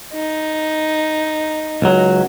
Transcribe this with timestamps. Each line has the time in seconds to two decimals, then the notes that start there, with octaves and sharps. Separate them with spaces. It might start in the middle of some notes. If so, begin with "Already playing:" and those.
0.13 D#4
1.82 C#2 F#3